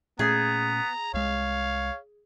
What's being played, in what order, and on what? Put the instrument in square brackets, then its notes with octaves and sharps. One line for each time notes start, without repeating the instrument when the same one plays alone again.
[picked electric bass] A#2 A3 C#4 [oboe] B3 [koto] G#4 [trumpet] A#5
[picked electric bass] C2 G#3 [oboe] C#5 [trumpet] F5